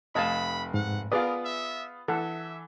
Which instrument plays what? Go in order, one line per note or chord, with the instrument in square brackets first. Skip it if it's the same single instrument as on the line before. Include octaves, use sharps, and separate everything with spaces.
[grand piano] F1 F5 [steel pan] D#5 G#5 A5 [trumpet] B5
[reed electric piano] G#2 [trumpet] F#5
[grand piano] B3 F4 [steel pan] G#4 B4 D5 [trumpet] A#4 [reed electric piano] D#6
[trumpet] E5
[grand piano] E3 [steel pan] A4 F#5 [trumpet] E5